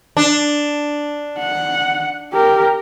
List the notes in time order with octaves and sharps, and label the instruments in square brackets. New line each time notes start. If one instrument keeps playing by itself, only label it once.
[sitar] D4
[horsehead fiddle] F#5
G4 A#4